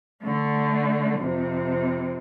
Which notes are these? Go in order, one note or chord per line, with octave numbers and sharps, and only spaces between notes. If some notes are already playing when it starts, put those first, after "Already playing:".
D3 A3
F2 C3